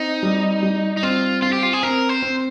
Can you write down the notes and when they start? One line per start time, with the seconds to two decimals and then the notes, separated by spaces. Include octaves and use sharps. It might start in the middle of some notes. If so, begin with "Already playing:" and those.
Already playing: C4 D#4
0.23 G3
0.63 G3
0.97 D#4
1.03 C4 F4
1.42 C4 F4
1.53 G4
1.63 F4
1.73 G#4
1.83 C4 A#4
2.09 C5
2.22 C4